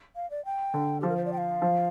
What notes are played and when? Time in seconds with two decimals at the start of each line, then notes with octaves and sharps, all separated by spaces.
0.16 F5
0.30 D5
0.45 G5
0.74 D3
1.01 F3 G4
1.09 A#4
1.17 C5
1.25 D5
1.33 G5
1.38 F5
1.62 F3